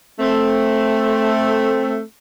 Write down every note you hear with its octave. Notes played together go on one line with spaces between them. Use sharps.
A3 C4